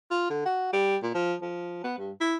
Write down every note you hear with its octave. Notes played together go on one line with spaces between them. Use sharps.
F4
D3
F#4
G3
A#2
F3
F3
B3
G2
E4